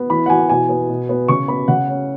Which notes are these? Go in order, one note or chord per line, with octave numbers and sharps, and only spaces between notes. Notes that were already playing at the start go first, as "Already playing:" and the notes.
Already playing: B3
E3 B5
F#5
E3 G#5
B2 G#5
B3
B2
B3
C#3 C#6
B3 B5
C#3 F#5
C#4